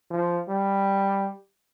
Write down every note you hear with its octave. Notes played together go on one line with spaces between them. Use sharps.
F3
G3